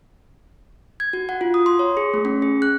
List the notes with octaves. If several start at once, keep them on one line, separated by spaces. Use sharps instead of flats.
G#6
F#4
F#5
F4
D#6
C6
C#5
G#4
A3
C#4
G#4
F#6